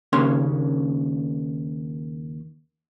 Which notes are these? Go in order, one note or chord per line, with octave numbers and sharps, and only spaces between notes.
D#2 C#3 A#3 C#4 C6